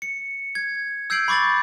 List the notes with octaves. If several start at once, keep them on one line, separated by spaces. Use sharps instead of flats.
C#7
G#6
E6 G6 G#6 C7 D7 F#7
B5 C#6 D6 A6 F#7